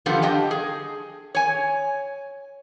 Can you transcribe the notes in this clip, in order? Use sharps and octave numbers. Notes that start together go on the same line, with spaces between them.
D3 F3 G3 B3 F4
G4 D#5 G5 A5
G#4
C#5 G#5